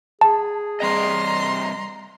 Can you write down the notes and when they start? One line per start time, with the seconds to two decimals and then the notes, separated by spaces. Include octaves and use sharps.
0.21 G#4 A5
0.80 G3 C4 D#5 A#5 C6